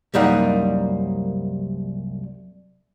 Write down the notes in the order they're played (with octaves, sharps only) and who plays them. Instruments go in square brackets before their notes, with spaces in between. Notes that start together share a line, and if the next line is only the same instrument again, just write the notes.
[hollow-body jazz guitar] C2 F#2 G3 A#3 D#4 F#5